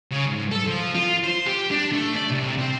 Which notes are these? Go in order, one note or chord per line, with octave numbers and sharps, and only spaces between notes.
C#3
G#2
A4
F3
F4
C5
G4
D4
A3
D5
C2
C4